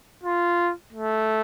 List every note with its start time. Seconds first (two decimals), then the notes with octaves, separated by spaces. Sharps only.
0.23 F4
0.93 A3